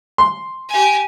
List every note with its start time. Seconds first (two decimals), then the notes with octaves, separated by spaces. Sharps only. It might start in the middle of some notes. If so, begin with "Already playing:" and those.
0.18 C6
0.69 G4 G#5